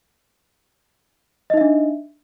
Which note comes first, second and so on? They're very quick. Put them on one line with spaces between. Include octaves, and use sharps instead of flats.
D#5 D#4 E5 D4